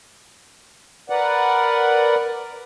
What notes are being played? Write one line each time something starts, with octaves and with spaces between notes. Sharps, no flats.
A#4 B4 D5 F#5